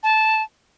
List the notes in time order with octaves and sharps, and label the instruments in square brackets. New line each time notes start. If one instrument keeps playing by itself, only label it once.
[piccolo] A5